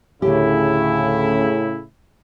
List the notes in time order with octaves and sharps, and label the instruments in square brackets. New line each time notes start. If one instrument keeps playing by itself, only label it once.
[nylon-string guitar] D2 G4 [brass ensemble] A2 C#3 E4